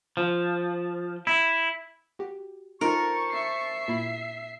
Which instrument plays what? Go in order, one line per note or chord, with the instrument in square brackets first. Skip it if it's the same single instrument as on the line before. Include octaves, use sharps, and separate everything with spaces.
[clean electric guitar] F3
E4
[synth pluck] F#4 G4
[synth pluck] D#4 F4 [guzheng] A#4 [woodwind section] C5 A5 C#6
[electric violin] E5 C7
[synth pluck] A#2 E4